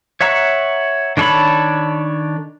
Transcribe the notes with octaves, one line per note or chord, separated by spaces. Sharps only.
C#5 E5 F#5 A#5 C#6
D#3 D4 A4 C#5 B5